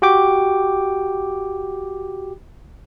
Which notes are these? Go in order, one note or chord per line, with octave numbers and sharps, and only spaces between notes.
F#4 G4 G5 D6